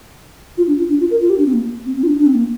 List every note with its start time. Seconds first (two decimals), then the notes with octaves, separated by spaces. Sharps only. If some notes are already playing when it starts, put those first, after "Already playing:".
0.58 F4
0.67 D4
0.78 F4
0.89 D4
1.00 F4
1.11 A#4
1.21 F4
1.30 G4
1.38 D4
1.46 C4
1.53 A#3
1.86 C4
1.96 C4
2.03 F4
2.07 D4
2.18 D4
2.26 C4
2.35 A#3